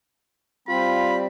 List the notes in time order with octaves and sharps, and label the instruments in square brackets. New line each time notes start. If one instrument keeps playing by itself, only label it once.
[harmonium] G3 C4 [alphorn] F4 [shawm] B5